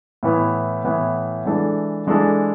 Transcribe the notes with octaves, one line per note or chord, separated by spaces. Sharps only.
A2 E3 B3
A2 E3 B3
E3 G#3 D4 A4
E3 G#3 D4 A4